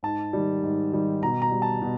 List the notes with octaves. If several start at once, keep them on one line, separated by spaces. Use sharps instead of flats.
G#2 A5
D#3 G3
G#2
D#3 G3
B2 A#5
A#5
G3
A5
B2